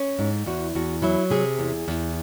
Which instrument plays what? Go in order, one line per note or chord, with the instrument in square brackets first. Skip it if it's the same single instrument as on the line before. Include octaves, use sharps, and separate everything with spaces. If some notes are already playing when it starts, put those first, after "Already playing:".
Already playing: [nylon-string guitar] C#4
G#2
E2 F#4
E2 F#4
F#3 E4
C3 G#4
E2
E2